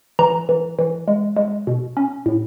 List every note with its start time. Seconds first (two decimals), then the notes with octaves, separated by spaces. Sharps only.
0.19 E3 A#5
0.49 E3
0.79 E3
1.08 G#3
1.36 G#3
1.67 B2
1.97 C#4
2.26 A2